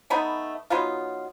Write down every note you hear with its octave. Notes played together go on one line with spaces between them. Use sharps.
A3 B3 D#4
F#3 B3 D#4 F4